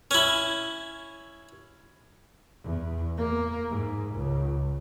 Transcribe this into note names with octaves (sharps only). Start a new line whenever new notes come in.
C#4 E4
E2
A#3
G#2
C#2